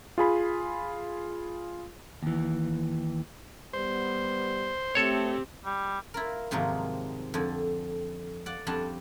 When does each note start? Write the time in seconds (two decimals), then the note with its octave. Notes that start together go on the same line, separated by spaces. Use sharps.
0.18 F4 G#4 B5
2.23 D#2 E3
3.73 G3 B3 C5
4.95 A3 C4 G4 A4 C#5
5.65 G3
6.14 E4 F4 A#4
6.51 G#2 C3 D#3 F3 F#3 A#3
7.34 F2 D3
8.46 D5 F#5
8.67 F2 G3 D4 F#5 A5